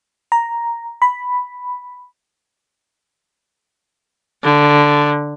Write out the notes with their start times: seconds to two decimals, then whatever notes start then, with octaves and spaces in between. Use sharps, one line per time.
0.32 A#5
1.02 B5
4.44 D3